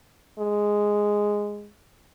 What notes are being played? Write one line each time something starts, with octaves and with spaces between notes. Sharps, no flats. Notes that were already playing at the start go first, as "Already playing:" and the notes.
G#3